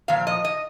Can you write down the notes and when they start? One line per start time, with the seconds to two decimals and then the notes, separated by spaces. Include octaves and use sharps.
0.08 A#2 F3 F5
0.27 D#5
0.45 D#5